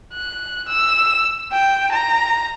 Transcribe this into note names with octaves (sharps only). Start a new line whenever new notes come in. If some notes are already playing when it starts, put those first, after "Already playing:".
F#6
E6
G5
A#5